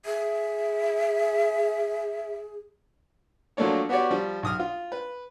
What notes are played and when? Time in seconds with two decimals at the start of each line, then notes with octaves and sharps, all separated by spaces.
0.05 G#4 E5
3.57 F3 F#3 A3 A#3 D4 C#5
3.89 B3 F#4 G4 C#5 D5
4.11 F3 G3
4.43 B1 D#6 F6
4.59 F4
4.92 B4